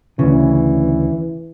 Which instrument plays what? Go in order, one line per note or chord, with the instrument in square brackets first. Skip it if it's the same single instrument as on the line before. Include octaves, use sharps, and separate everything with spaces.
[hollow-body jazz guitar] D2 C#3 [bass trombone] E3